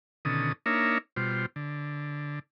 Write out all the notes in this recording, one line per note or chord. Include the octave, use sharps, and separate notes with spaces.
B2 D3 D#3 C#4 A4 D#6
A#3 D4 D#4 A#4 C#5 E5
B2 G3 F4 C5
D3